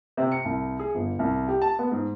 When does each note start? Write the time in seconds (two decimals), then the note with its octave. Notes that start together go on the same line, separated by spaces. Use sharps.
0.17 C3
0.32 C#7
0.45 C2
0.79 G#4
0.95 G1
1.19 C2
1.48 G4
1.62 A5
1.79 B3
1.91 G#2